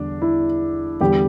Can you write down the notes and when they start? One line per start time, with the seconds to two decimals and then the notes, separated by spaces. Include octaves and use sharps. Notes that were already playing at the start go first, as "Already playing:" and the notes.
Already playing: E2 D3 G3 D4
0.22 E4
1.01 E2 D3 G3 G4